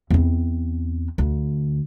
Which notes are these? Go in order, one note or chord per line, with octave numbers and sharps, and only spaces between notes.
E2 C4
D2